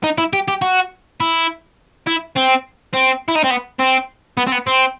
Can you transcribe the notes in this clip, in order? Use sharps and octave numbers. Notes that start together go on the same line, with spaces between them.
D#4
E4
G4
G4
F#4
E4
E4
C4
C4
E4
D#4
C4
B3
C4
B3
C4
B3
C4